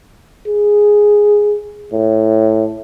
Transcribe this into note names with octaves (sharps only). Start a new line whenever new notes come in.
G#4
A2